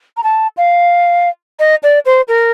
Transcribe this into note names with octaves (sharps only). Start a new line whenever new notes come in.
A#5
A5
F5
D#5
D5
C5
A#4